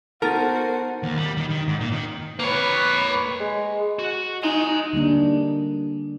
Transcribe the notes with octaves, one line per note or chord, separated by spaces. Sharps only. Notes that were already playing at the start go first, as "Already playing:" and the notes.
B3 D#4 F#4 A#4 C5 A5 F6 A6
D#2
G3
D#3
D#3
G#2
A#2
D#3
A#3 B4 C#5
G#3
F#4
D#4 G#5 C6
D3 G3 A#3 D4